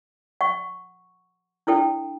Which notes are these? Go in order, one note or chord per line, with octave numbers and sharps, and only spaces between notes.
F#5 C#6
D4 E4 A4 G5